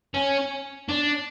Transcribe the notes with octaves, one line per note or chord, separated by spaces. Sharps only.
C#4
D4